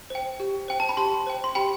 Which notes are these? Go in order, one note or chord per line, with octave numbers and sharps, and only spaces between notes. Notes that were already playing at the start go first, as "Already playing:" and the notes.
C5 G5
G4
C5 G5
A5
B5
G4 A5 C6
C5 G5
C6
G4 G5 B5